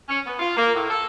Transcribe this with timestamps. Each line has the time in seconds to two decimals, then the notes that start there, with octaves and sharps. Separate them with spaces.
0.09 C#4
0.27 B3
0.40 F4
0.57 A#3
0.75 A2
0.90 A4